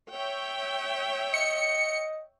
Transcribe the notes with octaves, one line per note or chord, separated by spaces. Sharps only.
C#5 E5 G5
D#5 C#7